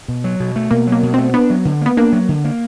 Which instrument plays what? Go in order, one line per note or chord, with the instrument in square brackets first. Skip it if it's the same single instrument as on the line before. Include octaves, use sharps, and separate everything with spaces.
[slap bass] B2
F#3
B2
A3
[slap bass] B2 [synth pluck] A#3
[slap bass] F#3
[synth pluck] A#3
[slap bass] B2
[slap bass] A3 [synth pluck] C4
[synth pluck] B3 [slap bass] D4
[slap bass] F#3
D3
[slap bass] A#3 [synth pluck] B3
[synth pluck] A#3 [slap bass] D4
[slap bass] F#3
D3
A#3